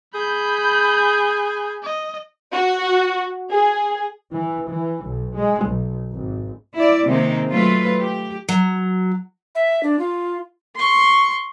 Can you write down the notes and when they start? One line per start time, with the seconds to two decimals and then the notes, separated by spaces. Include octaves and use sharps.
0.15 G#4 B5 G6
1.83 D#5
2.53 F#4
3.51 G#4
4.34 E3
4.68 E3
5.04 B1
5.35 G#3
5.65 B1
6.11 G#1
6.74 E4 D5
7.07 C3 D#3 G#3 A#3 C4 D#4
7.50 F#3 A3 F4 B4
7.99 G4
8.49 F#3
9.55 E5
9.83 D4
9.99 F4
10.76 C6 C#6